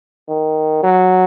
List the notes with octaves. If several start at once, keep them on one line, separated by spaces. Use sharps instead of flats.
D#3
F#3